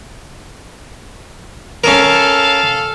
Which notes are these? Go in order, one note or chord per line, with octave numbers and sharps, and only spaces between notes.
C#4 A4 A#4 F5